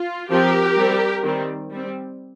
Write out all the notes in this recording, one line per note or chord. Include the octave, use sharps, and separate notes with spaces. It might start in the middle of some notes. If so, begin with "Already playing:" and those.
Already playing: F4
F3 C4 G4 A#4
G3 C4
D#3 G3 C4
G3 C4